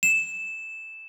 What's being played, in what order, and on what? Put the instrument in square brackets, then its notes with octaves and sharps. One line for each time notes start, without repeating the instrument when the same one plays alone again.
[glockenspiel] E7